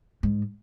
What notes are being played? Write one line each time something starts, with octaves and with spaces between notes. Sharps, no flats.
G#2